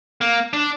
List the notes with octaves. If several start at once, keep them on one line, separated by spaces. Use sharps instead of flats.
A#3
D4